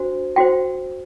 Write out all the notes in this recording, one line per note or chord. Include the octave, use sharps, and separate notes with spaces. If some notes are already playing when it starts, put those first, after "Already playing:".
Already playing: D4 F#4 C5
F#4 C5 G5